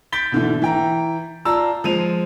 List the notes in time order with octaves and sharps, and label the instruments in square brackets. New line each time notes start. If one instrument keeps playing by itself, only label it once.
[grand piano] G6 A6 B6 D7 G7
B2 D3 E3
E3 G5 A#5
F4 D5 A5 A#5 E6
F3 G#3 D#7 F7